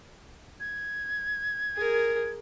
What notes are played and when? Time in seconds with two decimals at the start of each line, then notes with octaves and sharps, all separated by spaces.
0.60 G#6
1.76 G#4 A#4